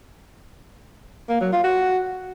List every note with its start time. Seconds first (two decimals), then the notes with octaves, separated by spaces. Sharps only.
1.29 A#3
1.41 F#3
1.52 F4
1.64 F#4